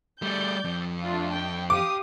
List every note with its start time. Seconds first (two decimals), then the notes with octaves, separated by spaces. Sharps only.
0.22 G3 A3 D5 G6
0.65 F2
1.02 A3 D4 F4
1.33 G5
1.70 G4 F5 D6 D#6